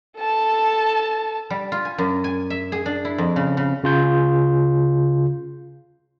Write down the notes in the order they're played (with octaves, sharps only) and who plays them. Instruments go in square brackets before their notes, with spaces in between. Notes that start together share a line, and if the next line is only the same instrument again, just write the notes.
[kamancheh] A4 A5
[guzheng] G3
F4
G#5
F#2
G#5
E5
G#4
D4
E4
F2
C#3
C#3
[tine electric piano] C#3 F4 G6